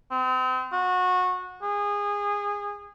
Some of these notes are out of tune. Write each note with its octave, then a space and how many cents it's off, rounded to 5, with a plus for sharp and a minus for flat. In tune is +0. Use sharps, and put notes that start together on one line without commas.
C4 -35
F#4 -20
G#4 -25